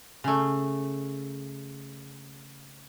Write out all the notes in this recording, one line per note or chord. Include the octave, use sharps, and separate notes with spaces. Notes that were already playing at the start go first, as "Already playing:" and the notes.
C#3 A3